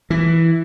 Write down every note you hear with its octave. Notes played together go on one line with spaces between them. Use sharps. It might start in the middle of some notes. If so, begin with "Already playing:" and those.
E3